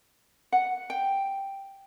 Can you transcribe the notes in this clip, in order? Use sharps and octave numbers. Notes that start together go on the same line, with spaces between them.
F#5
G5